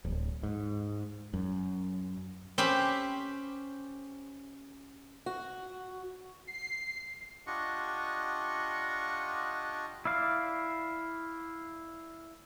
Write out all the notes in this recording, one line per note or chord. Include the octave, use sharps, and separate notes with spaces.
D1
G#2
F#2
C4 C#4 G4 B5
F#4
C7
D4 F4 G4 D#5 F#5 C#6
E4 D5 F5